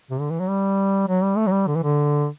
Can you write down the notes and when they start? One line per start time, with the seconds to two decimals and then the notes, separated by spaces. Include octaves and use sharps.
0.11 C3
0.20 D3
0.30 E3
0.40 F#3
0.49 G3
1.08 F#3
1.23 G3
1.37 A3
1.47 F#3
1.52 G3
1.67 D3
1.75 E3
1.84 D3